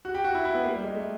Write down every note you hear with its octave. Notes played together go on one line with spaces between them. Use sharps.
F#4
G4
F#4
E4
E4
B3
A#3
G3
G#3
A3